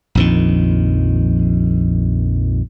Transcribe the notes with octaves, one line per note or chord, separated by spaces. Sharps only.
A#1 F2 D#3